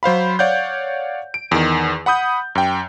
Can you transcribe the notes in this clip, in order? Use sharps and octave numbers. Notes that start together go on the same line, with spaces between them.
F#3 C5 F5 B5
C#5 D5 F5 F#5 G6
D7
E2 D#3
F#5 B5 D#6 G6
F#2 G5